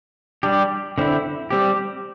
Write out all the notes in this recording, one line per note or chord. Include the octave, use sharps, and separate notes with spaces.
G3 D4 G4
D3 C4 E4
G3 C4 G4